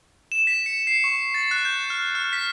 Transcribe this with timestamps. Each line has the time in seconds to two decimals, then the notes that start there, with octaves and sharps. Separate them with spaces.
0.32 E7
0.47 B6
0.66 C#7
0.87 C7
1.04 C#6
1.34 A6
1.51 F#6
1.65 G6
1.90 F6
2.15 F6
2.33 B6